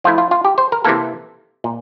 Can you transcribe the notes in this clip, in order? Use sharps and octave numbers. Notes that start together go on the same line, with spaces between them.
F3 A3 E4 F4
F4
F4
G4
C5
A#4
C3 E3 A#3 A4
A#2